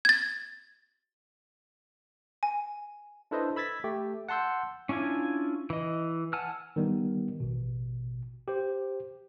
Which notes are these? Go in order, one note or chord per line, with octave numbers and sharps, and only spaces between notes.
G#6 A6
G#5
D4 E4 A4 B4 C5 D#5
B5 E6 G#6 A6 B6
A3 G4
F#5 A5 C6 E6 G6
C#4 D4 E4 F4 G#5
E3 D#5
F#5 G#5 A5 E6 F6
D#3 G3 B3
A1 B2
G4 C5